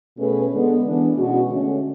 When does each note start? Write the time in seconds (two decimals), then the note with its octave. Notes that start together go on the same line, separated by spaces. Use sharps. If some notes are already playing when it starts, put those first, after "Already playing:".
0.17 B2 A3 C#4 G#4 B4
0.50 D3 G#3 B3
0.83 E3 B3 D4
1.16 B2 G#3 C#4 F#4
1.49 D3 A3 C#4